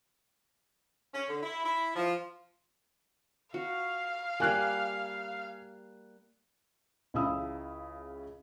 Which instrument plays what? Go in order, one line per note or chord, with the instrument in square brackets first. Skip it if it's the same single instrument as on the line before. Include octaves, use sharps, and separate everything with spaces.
[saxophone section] C#4
D3
E4
E4
F3
[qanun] F#4 [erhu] F5
[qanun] G3 A#3 [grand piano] G#5 F#6
[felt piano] C#2 C#3 E4 F5 D#6 E6